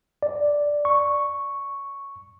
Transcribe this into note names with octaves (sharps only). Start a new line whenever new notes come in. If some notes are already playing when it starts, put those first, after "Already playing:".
D5
C#6